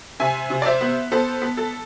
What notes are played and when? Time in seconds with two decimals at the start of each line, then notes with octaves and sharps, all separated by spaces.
0.20 C3 E5 G#5
0.50 C3
0.62 D5
0.66 C5 E5
0.81 B3
1.12 B3 A4 C5
1.42 B3
1.57 A4